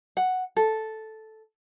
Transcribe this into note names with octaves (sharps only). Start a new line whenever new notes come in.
F#5
A4